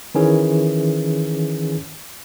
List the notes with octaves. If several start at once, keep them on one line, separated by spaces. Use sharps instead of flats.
D#3 E3 C#4 G#4